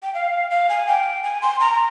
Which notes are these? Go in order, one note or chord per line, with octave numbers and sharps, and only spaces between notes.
G5
F5
F5
G#5
G5
G#5
C6
A#5